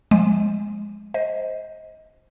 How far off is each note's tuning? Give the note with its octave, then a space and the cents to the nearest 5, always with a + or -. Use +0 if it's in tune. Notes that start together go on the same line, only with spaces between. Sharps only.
F3 +30 G#3 -5
C5 +0 D#5 +20